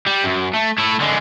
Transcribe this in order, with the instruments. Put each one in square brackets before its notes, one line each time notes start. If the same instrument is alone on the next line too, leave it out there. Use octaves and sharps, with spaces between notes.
[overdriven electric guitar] G3
F#2
A3
A3 E4
D3 G#3